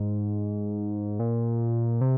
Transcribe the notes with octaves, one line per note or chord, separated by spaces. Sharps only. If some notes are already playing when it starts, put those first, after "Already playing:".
Already playing: G#2
A#2
C3